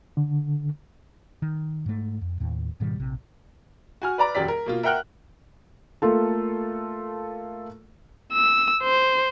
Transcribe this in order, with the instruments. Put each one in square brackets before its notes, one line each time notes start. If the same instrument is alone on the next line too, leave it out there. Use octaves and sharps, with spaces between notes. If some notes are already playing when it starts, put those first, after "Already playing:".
[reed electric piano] D3
[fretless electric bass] D#3
G#2 A3
F2
D#2 A2
G#2 B2 D#3 G3
A#1 C3
[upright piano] F#4 G#5 F6
B4 D5 A#5 D6
E1 F#2 G4 D5 B6
A#4
B2 A#3 F4
A#4 E5 F#5 G5 F6 F#6
[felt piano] A3 A#3 F4 A4
[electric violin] E6
C5